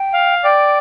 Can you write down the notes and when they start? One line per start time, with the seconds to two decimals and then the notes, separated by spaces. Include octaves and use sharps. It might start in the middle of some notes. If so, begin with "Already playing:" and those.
Already playing: G5
0.14 F5
0.44 D5 G5